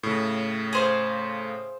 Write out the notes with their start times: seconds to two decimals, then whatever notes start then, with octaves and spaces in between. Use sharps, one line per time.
0.03 A2 C#3
0.73 G#4 C5 F5